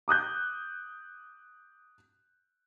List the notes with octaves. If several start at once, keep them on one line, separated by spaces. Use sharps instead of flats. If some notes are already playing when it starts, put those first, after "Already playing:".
D6 D#6 F#6 G6